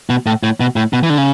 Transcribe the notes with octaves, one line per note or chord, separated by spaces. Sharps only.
B2
A2
A2
B2
A2
B2
E3
D3
C#3